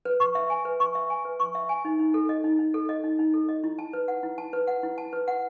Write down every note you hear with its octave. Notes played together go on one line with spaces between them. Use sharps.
B4
C#6
E5
G#5
B4
C#6
E5
G#5
B4
C#6
E5
G#5
D#4
D#4
A4
D#5
D#4
D#4
A4
D#5
D#4
D#4
A4
D#5
E4
A5
B4
F#5
E4
A5
B4
F#5
E4
A5
B4
F#5